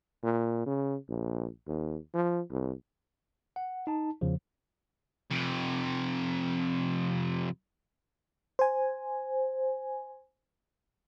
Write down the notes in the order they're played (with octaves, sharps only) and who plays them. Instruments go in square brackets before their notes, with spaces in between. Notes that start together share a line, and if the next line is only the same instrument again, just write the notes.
[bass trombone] A#2
C#3
A#1
D#2
F3
C2
[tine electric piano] F#5
D#4 A5
E2 C#3 F3
[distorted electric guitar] F2 C3
[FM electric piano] C5 G#5